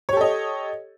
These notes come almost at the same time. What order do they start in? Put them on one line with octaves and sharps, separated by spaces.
C#5 G4 A4 D#5